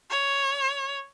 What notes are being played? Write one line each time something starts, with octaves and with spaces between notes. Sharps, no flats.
C#5